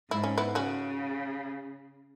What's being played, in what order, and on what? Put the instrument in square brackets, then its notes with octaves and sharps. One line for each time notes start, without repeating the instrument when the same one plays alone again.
[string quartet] G#2 [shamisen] E4
[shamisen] C#4
B3 E4
[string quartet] C#3 [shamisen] C#4 F#4